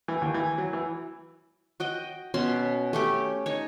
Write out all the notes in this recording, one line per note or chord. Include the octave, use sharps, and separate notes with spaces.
E3
D#2
E3
F#3
E3
F#4 D#5 G5
B2 C#4 C6
A3 C#4 G4
D#4 C#5